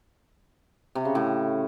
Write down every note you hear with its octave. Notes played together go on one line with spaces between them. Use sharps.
C3
C#3
A2